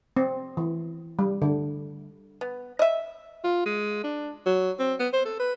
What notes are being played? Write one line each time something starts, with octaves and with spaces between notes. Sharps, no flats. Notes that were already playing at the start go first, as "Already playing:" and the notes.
C4
E3
G3
D3
B3
D#5 E5
F4
G#3
D4
F#3
C4
B3
C5
A4
B4